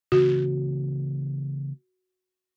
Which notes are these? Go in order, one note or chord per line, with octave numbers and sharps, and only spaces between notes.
C#3 E3 A#3 F#4